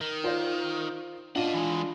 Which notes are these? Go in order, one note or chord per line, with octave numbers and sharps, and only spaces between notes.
D#3
F4 C5 D5
D4 F4 D#5 F#5
E3 G#3